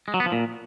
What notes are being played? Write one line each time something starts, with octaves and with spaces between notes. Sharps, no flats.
G#3
F#3
B3
F3
A#2